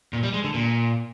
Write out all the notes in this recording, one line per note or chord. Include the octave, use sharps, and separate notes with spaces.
A#2
G3
G#3
D3
A#2